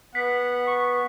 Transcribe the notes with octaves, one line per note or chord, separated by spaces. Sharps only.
B3 F#5 B6
C#6